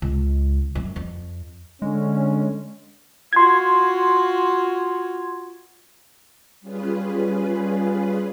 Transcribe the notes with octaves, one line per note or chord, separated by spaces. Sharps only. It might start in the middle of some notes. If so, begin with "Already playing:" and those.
C#2
F#2
F2
D3 G#3 C#4
F4 F#4 C6 G#6
G3 C#4 F4 G#4 B4